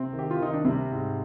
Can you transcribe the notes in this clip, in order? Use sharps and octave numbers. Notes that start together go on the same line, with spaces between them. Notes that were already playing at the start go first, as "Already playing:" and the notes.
Already playing: C3 C4
D#3
G4
F4
D#3 D#4
D4
C3 G3 C4
G#2